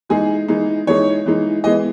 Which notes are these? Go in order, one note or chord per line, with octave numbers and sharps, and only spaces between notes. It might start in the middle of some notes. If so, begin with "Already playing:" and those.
E3 G#3 D#4 G#4
E3 G#3 D#4
E3 G#3 D#4 C#5
E3 G#3 D#4
E3 G#3 B3 D#5